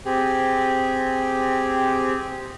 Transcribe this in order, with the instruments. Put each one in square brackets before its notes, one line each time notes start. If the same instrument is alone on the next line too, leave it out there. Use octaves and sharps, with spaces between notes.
[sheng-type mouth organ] C4 G4 G#4